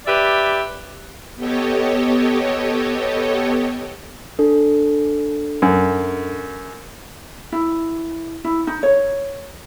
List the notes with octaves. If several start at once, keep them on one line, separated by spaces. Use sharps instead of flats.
G4 B4 D5 E5
B3 G4 A4 C#5 D#5
D4 A4
F#2
E4
E4
D#4
C#5